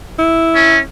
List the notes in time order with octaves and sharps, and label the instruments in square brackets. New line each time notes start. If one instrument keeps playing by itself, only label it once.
[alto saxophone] E4
[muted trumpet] C#4